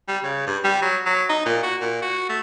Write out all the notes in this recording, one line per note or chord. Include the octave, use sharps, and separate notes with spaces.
G3
C#3
G2
G3
F#3
F#3
D#4
A#2
F#4
A#2
F#4
A3